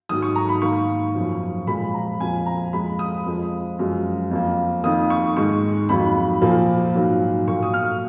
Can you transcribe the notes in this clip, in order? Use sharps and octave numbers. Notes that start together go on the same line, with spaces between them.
G#2 D#3 F#3 D#6
C#6
A#5
B5
G#2 D#3 A#3 C#6
F#2 C#3 F3
A#2 F3 G#3 B5
A#5
F2 F3 A#3 G#5
A#5
F2 F3 G#3 B5
D#6
F2 F3 G#3
F#2 F3 G#3
F2 F3 A#3
F2 D#3 A#3 D#6
C#6
G#2 D#3 G#3 C#6
F2 D#3 F#3 A#3 B5
A#2 F3 A#3
G#2 D#3 F#3 A#3
A#2 F#3 A#3 C#6
D#6
F6